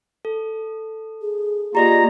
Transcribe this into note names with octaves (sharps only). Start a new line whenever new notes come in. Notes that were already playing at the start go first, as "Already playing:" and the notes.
A4
G#4
A#3 F4 G4 D5 D#5 A#5